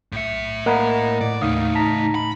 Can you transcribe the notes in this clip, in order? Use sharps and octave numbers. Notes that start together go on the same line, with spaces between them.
B1 A2 E5 C#7
A#3 A#4 D#5 F#5 A#5 B5
A2 D5
D#2 C#3 A3 D#4 F5 D#6
A5 A#5 B6
B5